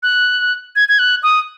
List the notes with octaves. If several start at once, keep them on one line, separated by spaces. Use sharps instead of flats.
F#6
G#6
G#6
F#6
D#6